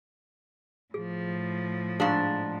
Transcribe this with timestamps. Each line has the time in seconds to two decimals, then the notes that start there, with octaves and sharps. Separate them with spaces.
0.94 A2 F3 G#4
2.00 G#2 D4 G#4 F5 C#6